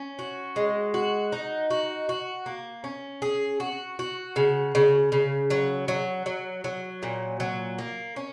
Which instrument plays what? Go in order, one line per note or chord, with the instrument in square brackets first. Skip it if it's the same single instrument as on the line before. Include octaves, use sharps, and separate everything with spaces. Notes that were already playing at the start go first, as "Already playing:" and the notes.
Already playing: [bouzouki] C#4
F#4
G#3
F#4
D#4
F#4
F#4
A#3
C#4
G#4
F#4
F#4
C#3
C#3
C#3
F#3
F#3
F#3
F#3
A#2
F#3
A#3
C#4